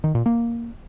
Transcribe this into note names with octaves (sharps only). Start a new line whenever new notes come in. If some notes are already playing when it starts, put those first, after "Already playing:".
D#3
A#2
A#3